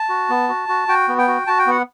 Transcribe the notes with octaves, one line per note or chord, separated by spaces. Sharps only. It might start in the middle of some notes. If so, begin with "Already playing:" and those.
Already playing: A5
F#4
B3
F#4
F#4
F#4 G5
B3
G5
F#4
F#4 A5
G5
B3 F#5